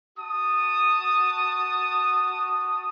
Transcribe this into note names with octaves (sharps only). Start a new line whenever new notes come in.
F#4 A5 D#6